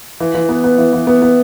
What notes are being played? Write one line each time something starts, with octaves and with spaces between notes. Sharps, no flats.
E3
E3
B3
B3
E3
E3
B3
B3